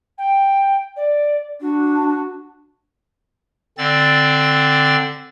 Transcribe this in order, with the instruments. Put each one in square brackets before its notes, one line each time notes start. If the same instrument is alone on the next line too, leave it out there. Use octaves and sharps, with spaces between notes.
[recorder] G5
D5
[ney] D4 [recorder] F#4
[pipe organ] D3 C4 D5 A6